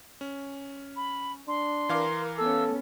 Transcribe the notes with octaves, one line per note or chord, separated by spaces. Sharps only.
C#4
B5
D4 C6
E3 A#4 F5 D6
B3 C#4 A4 E6